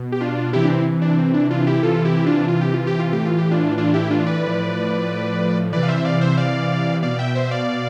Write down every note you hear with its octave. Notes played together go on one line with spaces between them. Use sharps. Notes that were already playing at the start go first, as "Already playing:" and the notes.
Already playing: B2
G4
D4 F4
C3 E3 E4 G4
D4
C4 E4
D4
C4
D4
D4 F4
E4 G4
C3 E3 F4 A4
E4 G4
D4 F4
F4
G4
F4
G4
F4
A2 E3 G4
F4
G4
D4 F4
D4 F4
E4 G4
D4 F4
B4 D5
A2 F3
C3 E3 B4 D5
F5
C5 E5
D5 F5
C5 E5
D5 F5
B2 D5 F5
E5 G5
C5 E5
D5 F5